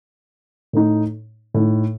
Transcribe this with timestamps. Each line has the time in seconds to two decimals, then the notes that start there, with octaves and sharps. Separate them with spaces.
0.73 A2 A3 D#4
1.54 A2 A3 D#4